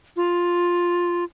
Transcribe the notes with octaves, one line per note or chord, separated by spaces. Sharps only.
F4